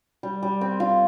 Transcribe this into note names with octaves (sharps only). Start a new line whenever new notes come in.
G3
G3
C4
F4